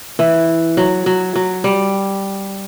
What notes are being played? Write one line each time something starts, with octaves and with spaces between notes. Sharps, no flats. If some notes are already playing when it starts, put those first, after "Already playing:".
E3
F#3
F#3
F#3
G3